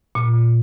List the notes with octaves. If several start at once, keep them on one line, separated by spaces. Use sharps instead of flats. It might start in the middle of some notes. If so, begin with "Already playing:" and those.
A#2